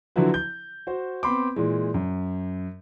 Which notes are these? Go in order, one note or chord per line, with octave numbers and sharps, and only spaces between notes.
D3 F3 F#3 E4 F#4 B4
G6
F#4 C5
B3 C4 B5 C6 D6
A#2 E3 G#3
F#2